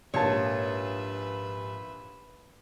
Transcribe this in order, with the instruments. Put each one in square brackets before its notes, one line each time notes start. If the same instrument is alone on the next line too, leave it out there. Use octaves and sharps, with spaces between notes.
[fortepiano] A#1 A5 [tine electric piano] G#2 G4 A6 [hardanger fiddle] B4 E5 [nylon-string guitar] C#5